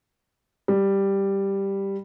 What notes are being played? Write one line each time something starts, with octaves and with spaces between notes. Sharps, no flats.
G3